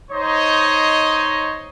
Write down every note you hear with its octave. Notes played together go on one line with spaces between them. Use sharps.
D#4 C5 C#5 D#5